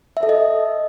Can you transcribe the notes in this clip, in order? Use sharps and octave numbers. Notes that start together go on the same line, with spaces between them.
E5
A4
D#5